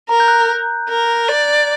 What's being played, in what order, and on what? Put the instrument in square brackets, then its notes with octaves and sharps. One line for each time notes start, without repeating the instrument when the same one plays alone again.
[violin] A#4 [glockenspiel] A#5
[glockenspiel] G6
F#6
[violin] A#4
D5